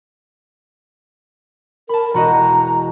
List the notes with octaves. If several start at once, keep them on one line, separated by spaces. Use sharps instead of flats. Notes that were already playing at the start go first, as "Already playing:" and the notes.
A#4 A5 B5
E1 F#4 D#5 A#5